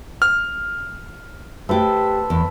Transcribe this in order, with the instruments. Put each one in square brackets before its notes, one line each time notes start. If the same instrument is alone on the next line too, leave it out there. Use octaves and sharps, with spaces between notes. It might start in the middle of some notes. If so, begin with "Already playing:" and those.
[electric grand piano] F6
[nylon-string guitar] A3 G4 [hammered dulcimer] A4 B4 C5
[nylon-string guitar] E2